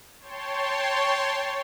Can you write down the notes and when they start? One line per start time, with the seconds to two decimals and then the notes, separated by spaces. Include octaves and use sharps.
0.19 C#5 G5 A5 C6